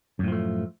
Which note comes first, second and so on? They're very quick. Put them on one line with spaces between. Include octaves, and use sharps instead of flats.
F#2 A2 F3 A3